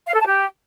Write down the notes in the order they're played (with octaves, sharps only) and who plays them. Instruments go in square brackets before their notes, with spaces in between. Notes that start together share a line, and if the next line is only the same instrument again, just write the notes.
[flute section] F5
A4
A5
G4